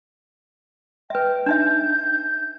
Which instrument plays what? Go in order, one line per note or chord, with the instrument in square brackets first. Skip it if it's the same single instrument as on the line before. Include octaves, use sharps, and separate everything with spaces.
[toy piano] B4 E5 [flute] G5
[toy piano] D4 D#4 E5 [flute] G6